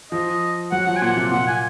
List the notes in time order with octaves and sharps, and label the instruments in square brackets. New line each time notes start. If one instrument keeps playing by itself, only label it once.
[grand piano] F3 [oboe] D#5
[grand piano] F#3 [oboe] F#5
[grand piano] F3 [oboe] F#5
[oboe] G#5
[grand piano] A#2 [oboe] F#5
[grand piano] C3
[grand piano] A#2 [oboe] F#5
[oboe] G#5